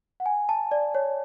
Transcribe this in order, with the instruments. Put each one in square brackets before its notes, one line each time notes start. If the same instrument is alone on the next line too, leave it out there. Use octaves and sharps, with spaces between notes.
[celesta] F#5
G#5
A5
D5
C#5